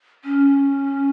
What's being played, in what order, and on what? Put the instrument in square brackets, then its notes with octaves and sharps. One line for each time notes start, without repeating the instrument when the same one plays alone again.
[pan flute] C#4